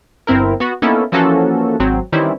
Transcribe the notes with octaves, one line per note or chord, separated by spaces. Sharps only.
G1 C4 E4 A#4
B3 F#4
A#3 B3 C#4 D#4 E4 A4
E3 F3 A#3 C#4 F#4 A4
G#1 F#3 C4
D#3 E3 G3 C4 C#4 E4